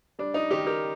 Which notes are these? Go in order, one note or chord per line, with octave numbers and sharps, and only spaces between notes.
G3 D4
D#4
D#3 D#4 G4
G4 A#4